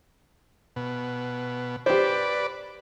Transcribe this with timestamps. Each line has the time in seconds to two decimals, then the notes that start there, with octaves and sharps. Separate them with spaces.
0.76 B2
1.86 G4 B4 C5 D5